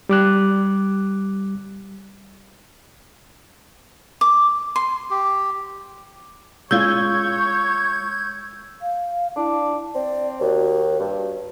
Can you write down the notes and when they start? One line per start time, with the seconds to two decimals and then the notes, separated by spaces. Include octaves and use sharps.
0.09 G3 D6 F#6
4.21 D6
4.76 C6
5.10 G4
6.71 G#3 C#4 F4 C#5 E6 G6 G#6
8.82 F5
9.36 D4 E4
9.95 C4 D5
10.41 D#2 F#4
11.00 G2